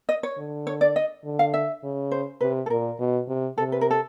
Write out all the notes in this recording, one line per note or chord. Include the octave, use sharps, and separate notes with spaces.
D#5
C#5
D3
C#5
D5
D#5
D3
F5
E5
C#3
C5
C3 B4
A4
A#2 A#4
B2
C3
C3 A4
B4
A#4
A4